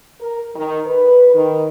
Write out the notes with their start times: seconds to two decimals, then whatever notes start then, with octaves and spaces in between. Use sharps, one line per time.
0.20 A#4
0.56 D#3
0.86 B4
1.34 D#3